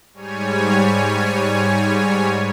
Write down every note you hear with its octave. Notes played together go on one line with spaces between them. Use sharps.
G#2 G3 C#5 G#5